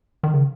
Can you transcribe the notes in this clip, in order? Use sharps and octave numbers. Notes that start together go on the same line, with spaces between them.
D#3
C#3